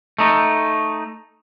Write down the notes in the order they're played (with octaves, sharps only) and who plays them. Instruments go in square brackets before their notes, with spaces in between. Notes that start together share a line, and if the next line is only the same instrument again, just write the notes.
[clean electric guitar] A3 D#4